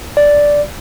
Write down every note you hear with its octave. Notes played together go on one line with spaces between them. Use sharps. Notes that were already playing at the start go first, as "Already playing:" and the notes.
D5